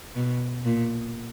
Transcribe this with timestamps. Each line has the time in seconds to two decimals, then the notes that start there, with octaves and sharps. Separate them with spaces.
0.15 B2
0.65 A#2